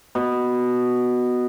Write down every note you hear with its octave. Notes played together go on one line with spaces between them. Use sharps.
B2